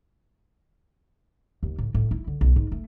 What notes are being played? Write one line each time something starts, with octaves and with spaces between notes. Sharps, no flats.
D#2
A2
A2
E4
D3
B1
G#2
A3